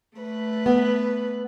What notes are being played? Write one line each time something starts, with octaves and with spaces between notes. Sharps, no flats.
A3 B4
B3